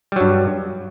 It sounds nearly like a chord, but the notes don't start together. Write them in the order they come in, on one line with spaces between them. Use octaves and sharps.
G3 F#3 G2